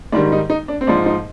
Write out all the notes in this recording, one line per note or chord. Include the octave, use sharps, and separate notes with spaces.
G#2 D#3 G3 D4
D#4
D#4
D4
C4
G#2 F3 D4
D#4